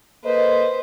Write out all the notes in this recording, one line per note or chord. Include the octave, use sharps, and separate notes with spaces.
A#3 A4 B4 C5 D#5